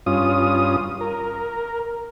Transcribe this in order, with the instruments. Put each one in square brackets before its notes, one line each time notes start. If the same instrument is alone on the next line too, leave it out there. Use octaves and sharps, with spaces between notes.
[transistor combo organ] G2 C#4 F4 D#6
A#4